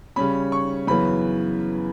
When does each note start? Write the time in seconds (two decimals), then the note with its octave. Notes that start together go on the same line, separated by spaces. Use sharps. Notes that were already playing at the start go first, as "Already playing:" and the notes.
0.16 C#3 G3 C#4 B5
0.52 C#6
0.87 F#2 C#3 E3 B3 B5